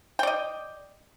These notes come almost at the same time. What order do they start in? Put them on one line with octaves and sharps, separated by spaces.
G5 D5 D#5